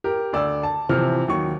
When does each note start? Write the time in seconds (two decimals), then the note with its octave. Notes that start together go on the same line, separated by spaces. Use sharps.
0.04 G4 A#4
0.33 D2 D5 E6
0.63 A5
0.89 C3 E3 F3 C4 F6
1.28 D#2 F#3 C#6